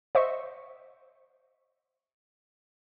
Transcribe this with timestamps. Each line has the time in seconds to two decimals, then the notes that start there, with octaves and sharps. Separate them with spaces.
0.15 C5 D#5 E5 C#6